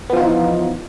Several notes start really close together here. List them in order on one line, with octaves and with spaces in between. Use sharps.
B3 F3 F4 D#4 E3